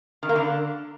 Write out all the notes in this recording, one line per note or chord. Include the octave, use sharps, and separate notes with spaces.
D#3
A#3
D3